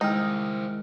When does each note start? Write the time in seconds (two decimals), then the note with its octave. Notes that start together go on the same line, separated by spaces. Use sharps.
0.01 D#3 G#3 D#4 E4 C5 G5 F6